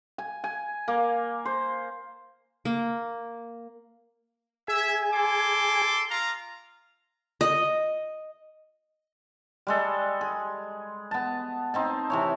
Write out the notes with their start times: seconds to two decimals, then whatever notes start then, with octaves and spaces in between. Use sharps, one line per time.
0.18 G#5
0.44 G#5
0.88 A#3
1.45 C5
2.65 A#3
4.68 G#4 E5 G#5
5.13 A4 C6 D6
6.10 F4 F5 A#5
7.41 D#5
9.67 G3 G#3 A4
10.21 G#4
11.11 B3 A5
11.74 C4 D#4 A5
12.10 C3 E3 C#5